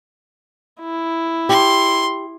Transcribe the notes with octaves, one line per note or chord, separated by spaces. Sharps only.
E4
G4 C6